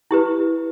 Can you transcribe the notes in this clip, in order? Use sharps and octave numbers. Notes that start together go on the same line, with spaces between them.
E4 G4 B4